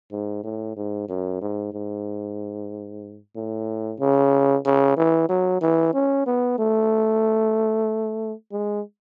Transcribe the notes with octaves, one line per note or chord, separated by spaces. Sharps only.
G#2
A2
G#2
F#2
G#2
G#2
A2
C#3
C#3
E3
F#3
E3
C#4
B3
A3
G#3